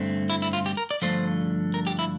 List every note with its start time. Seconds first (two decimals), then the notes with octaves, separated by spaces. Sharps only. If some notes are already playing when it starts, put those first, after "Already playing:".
Already playing: G2 D3 A3 C4
0.30 E4
0.42 E4
0.53 F4
0.66 G4
0.77 A#4
0.91 D5
1.02 G2 D3 F3 A3 C5
1.74 A#4
1.87 G4
1.99 E4